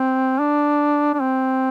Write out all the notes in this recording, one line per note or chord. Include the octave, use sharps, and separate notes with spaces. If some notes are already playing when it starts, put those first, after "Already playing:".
Already playing: C4
D4
D4
C4